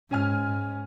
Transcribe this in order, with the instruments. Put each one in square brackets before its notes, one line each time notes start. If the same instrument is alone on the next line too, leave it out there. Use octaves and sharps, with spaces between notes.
[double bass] G#2 [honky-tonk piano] C#4 G#5 F6